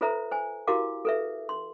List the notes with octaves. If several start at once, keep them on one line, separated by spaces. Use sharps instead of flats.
F4 A4 B4 C5 E5 A#5
C5 G#5
E4 F#4 G4 A#4 F5 D6
A4 B4 E5
C6